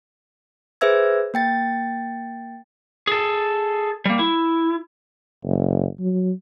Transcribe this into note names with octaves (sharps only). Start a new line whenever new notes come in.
G#4 B4 C5 E5 E6 G#6
A#3 G5 A6
G#4 A4
G3 A#3
E4
F#1
F#3